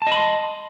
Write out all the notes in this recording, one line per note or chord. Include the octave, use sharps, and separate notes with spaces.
D#5 A5 B5 C6